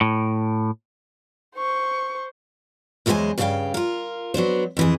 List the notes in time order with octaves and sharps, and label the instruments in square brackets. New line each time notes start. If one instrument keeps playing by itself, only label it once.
[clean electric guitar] A2
[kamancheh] C5 C#6
[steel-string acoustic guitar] E2 F#3 G#3 A#4 C5 G#5
G2 C#3 E4 A#4 F5 G5
F4 A#4
F#3 B3 D4 C5
F2 E3 G#4